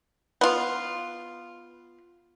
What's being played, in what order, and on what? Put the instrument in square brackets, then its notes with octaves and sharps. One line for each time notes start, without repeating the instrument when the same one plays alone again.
[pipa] B3 F4